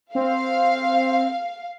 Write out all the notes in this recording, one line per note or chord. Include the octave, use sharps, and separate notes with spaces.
C4 F5